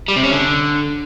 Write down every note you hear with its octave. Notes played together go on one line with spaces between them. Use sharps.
G3
C3
C#4
D3